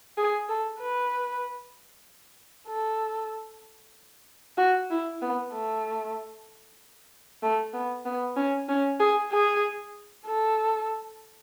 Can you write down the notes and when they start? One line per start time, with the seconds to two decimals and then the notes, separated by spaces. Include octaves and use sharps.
0.17 G#4
0.49 A4
0.80 B4
2.69 A4
4.58 F#4
4.91 E4
5.22 B3
5.53 A3
7.43 A3
7.74 B3
8.05 B3
8.37 C#4
8.69 C#4
9.00 G#4
9.32 G#4
10.26 A4